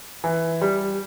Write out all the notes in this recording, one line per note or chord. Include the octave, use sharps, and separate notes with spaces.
E3
G3